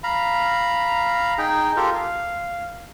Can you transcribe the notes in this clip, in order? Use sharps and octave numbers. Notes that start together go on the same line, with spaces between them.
F5 A#5 B5
D#4 G#4 G5
F4 G4 A4 A#4
F5